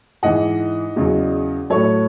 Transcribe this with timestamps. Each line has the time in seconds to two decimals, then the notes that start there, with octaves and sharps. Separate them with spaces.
0.23 G#2 E3 D#5 F#5
0.96 E2 C#3 F#3
1.70 A2 F#3 A4 C#5